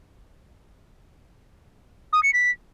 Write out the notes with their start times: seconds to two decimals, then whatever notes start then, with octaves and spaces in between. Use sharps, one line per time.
2.13 D#6
2.23 C#7
2.33 B6